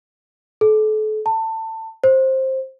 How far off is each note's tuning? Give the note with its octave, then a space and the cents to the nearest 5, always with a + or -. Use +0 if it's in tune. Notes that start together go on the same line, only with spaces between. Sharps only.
A4 -35
A5 +25
C5 +15